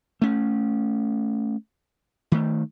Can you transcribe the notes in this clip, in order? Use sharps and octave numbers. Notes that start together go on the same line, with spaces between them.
A3 C#4
D#3 A3